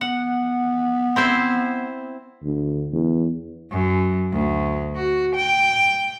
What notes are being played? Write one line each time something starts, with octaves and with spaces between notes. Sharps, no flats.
B3 F#5
C4 E4 C5
D2
E2
F#2
D2
F#4
G5